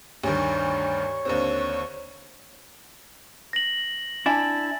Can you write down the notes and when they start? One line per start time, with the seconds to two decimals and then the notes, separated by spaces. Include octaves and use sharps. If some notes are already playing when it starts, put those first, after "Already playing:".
0.24 D2 G2 D#3 C#5
1.25 D#2 D3 C4
3.53 A#6 F#7
4.26 D4 E4 G#5 A5 A6